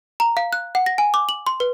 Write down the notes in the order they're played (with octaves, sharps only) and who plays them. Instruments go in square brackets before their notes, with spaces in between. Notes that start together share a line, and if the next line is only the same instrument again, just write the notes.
[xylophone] A#5
F5
F#6
F#5
A#6
G#5
D6
F#7
C6
B4